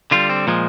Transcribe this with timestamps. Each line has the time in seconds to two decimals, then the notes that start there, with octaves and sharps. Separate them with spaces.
0.11 D3 G3 F4
0.29 C4
0.47 A#2 F3 G#3